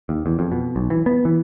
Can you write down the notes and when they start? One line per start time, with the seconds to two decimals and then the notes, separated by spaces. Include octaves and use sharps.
0.09 D#2
0.26 E2
0.39 F2
0.52 B2
0.76 B1
0.90 E3
1.06 B3
1.25 E3